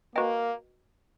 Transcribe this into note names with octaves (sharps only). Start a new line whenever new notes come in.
A#3 F#4 B4 D#5 G5